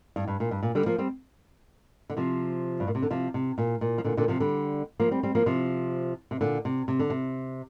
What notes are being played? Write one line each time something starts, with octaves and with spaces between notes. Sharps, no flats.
G2
G2
A#2
G2
A#2
D3 G3
F3 A#3
G3 C4
D3
C3 F3
G2
A#2
C3
D3
C3 F3
C3
A#2
A#2
F3
A#2 D3
A#2 D3
C3 F3
D3 G3
F3 A#3
G3 C4
G3 C4
F3 A#3
C3 F3
C3
A#2 D3
C3
C3
D3
C3